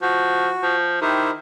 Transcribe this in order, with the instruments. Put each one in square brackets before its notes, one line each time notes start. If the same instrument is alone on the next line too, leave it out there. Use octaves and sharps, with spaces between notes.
[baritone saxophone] F3 [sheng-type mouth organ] F#4
[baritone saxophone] F3
[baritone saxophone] D#3 [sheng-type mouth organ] E4 G4 C5